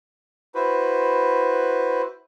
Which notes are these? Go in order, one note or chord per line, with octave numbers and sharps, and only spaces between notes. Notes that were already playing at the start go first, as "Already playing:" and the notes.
E4 F#4 B4 C5